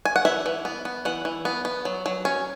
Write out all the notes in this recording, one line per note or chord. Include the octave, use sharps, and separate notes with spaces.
G#5
F#5
E3 E5
E3
B3
B3
E3 F#5
E3
B3
B3
F#3
F#3
C#4